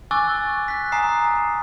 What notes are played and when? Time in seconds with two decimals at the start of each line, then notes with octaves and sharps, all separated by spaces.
0.11 G#5 C#6 D6 E6 F#6 A6
0.68 F#6 B6
0.92 G#5 A#5 D#6 C7
1.14 A#5